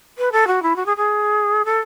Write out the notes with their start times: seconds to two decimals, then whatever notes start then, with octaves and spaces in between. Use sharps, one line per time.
0.18 B4
0.32 A4
0.47 F#4
0.63 E4
0.76 F#4
0.86 G#4
0.97 G#4
1.65 A4